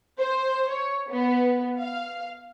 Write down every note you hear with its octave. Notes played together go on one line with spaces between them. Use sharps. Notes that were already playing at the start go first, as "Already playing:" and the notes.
C5
C#5
B3
F5